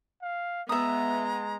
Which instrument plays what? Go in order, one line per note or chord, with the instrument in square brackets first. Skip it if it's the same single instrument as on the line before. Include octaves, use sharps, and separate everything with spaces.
[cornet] F5
[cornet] G#3 [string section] B3 [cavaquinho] E5 D#6 [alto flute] A#5